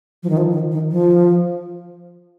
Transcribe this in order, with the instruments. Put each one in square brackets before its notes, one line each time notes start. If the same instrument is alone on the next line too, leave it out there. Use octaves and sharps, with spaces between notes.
[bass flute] F3
D#3
F3
D#3
D#3
F3